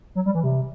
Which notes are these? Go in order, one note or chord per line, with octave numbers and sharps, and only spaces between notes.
F#3
G3
E3
C3